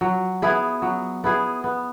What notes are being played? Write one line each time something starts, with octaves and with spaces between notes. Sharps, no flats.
F#3
B3 E4 G#4
F#3
B3 E4 G#4
B3